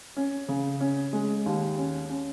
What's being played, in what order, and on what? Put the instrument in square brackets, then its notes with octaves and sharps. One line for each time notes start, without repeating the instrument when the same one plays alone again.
[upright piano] C#4
C#3
C#4
G#3
D#2
C#4
C#4